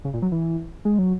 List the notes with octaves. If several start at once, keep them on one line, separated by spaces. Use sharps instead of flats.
C#3
A#2
F#3
E3
G#3
F#3